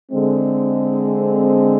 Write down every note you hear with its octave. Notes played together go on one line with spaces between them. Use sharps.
D3 G#3 C4